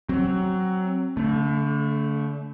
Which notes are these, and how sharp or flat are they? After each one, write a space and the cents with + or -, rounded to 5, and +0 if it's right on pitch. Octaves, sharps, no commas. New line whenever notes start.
F#3 +15 C4 +25
D3 -35 A3 +0